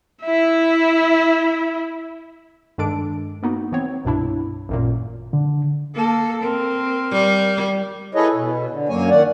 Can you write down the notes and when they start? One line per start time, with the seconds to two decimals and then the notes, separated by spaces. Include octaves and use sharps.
0.24 E4 E5
2.78 G2 D#3 G#3 D4 A4 D7
3.43 A#3 B3 D#4 F#4
3.72 E3 B3 C4 C#5
4.05 C2 G2 B2 D4 E4
4.69 A1 F#2 A#2
5.33 D3
5.95 A#3 A4
6.43 C4 A#4
7.11 G3
8.15 E4 G#4 A4 B4 C#5 D#5
8.35 B2
8.70 D3
8.89 F#2 F#3 A#3 C#5 G#5
9.10 D#3 D5 F#5